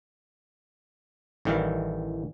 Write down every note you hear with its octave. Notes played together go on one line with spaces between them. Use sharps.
A1 A2 D#3 E3 G3 F5